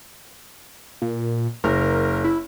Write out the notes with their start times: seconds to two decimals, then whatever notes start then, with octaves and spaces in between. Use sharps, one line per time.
1.02 A#2
1.64 F#1 A#4
2.24 E4